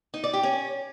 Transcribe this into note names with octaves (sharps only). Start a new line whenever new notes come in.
D#4
D5
G4
C#4